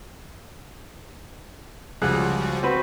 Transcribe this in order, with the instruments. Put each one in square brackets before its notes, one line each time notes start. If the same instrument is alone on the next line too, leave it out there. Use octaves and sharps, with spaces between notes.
[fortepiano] C#2 G#4 F#6 [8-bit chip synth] F3 G3 F#4
[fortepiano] C4 F#4 B4